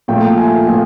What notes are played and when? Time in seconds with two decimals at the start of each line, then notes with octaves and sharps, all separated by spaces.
0.08 A#2 F3 A3 G5
0.38 G#5
0.68 A#2 F3 A3